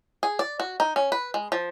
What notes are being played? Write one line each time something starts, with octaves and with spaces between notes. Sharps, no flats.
G#4
D5
F#4
D#4
C#4
B4
G#3
F3